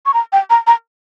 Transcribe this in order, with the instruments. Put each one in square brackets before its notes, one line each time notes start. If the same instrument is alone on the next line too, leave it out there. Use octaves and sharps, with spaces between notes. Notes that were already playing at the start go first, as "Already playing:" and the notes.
[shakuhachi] C#6
A#5
G5
A#5
A#5